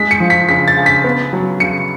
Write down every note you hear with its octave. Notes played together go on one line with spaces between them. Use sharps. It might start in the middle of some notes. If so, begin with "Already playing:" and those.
Already playing: G#3 B6
C#7
F3
B6
C#3 B6
A6
C#3
B6
B3
F#3
C#3 C#7